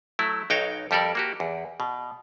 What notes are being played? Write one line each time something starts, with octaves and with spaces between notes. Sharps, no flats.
F#3 A3 E4
B1 D#4 F#4 C#5 F5 G5
F2 G3 G4 A4 A#4 D5
A#3 F#4 G4
E2
B2